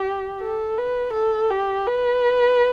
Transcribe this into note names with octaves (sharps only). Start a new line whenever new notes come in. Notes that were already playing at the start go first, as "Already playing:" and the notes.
Already playing: G4
A4
B4
A4
G4
B4